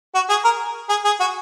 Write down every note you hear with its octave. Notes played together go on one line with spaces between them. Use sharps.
F#4
G#4
A#4
G#4
G#4
F#4